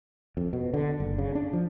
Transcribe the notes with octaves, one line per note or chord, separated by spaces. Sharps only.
F2
B2
D3
F#1
C#3
D4
F3